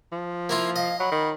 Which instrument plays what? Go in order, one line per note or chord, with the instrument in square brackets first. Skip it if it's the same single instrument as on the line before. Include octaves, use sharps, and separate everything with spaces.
[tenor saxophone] F3
[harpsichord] A#3 E4 F4
[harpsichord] D#5 [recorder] F5
[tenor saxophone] F#3 [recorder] B5
[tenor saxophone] D#3